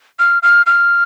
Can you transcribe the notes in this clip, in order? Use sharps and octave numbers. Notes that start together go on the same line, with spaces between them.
F6
F6
F6